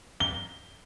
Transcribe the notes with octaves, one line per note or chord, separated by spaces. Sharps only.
G7